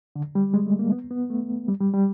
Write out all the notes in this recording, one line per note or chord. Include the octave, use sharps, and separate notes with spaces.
D3
G3
G#3
A3
A#3
B3
B3
A3
G3
G3
G3